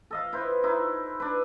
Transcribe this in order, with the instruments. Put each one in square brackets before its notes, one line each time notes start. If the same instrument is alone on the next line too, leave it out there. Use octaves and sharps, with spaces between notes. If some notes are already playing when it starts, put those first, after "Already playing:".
[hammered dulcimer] A4 D#5 F5
E4 B4 C5
D#4 E4
D4 B4